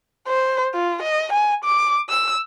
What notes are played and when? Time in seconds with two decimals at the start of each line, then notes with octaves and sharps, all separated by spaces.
0.28 C5
0.74 F4
1.03 D#5
1.33 G#5
1.65 D6
2.10 E6